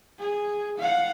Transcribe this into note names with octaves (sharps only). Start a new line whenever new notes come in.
G#4
F5 F#5